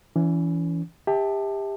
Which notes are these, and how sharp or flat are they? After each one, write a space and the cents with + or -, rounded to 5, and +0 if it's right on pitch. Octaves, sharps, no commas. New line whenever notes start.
E3 +15 C#4 +40
G4 +25 E5 -35 A5 +0